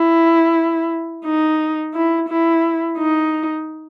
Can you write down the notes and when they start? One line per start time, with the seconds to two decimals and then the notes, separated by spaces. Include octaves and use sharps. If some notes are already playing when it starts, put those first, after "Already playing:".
Already playing: E4
1.25 D#4
1.94 E4
2.29 E4
2.98 D#4